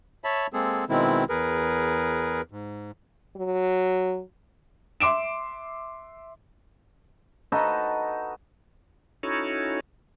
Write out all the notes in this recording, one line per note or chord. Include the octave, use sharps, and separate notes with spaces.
C#5 E5 A5 B5
G#3 A#3 C4 G#4 A4
B2 D#3 G#3 C4 E4
E2 G#4 A#4 B4
G#2
F#3
E5 C6 D6 D7 E7
D#4 F#4 A4 B4
C#4 D#4 E4 F#4 A4 C#5